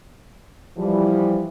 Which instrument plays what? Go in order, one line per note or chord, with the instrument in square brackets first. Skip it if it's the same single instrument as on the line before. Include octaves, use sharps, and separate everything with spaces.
[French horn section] E3 F3 G3